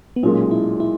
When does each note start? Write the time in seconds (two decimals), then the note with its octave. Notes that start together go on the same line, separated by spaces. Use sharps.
0.16 B3
0.23 B1 A#2 G#3 C#4
0.51 E4
0.80 E4